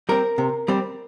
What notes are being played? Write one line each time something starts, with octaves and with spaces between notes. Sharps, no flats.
G3 C4 A#4
C3
G3 C4